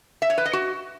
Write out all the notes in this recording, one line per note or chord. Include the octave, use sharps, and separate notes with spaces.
E5
C#5
B4
D#5
F#4